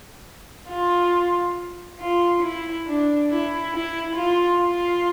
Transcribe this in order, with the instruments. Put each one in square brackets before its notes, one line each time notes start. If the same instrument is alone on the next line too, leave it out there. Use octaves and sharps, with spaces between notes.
[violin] F4
F4
E4
D4
E4
E4
F4
F4